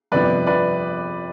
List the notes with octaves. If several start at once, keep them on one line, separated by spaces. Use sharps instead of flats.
G1 F2 C3 F3 B4 D5
C3 F3 B4 D5